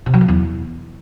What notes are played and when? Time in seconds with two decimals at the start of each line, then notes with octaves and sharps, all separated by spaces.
0.06 C3
0.14 F#3
0.21 C#3
0.28 E2